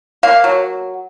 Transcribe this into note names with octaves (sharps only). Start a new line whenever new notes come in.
A#3 F5
F#3